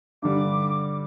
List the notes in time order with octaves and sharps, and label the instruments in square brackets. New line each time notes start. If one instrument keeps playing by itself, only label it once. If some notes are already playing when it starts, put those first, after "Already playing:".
[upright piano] G2 D3 G3 [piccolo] D6